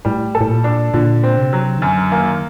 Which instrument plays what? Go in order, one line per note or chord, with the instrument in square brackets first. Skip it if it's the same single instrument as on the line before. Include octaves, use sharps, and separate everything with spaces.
[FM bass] A2 [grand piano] G3
[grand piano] A4
[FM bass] A2
A#2
[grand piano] D4
[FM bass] A#2 [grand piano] D3
[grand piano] C4
[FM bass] C3
[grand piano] F#3
[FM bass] D#3
[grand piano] F#2 [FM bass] D3
[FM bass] D#3 [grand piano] A#3